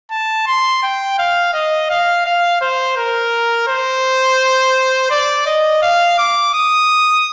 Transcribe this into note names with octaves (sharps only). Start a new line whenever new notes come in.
A5
C6
G5
F5
D#5
F5
F5
C5
A#4
C5
D5
D#5
F5
D6
D#6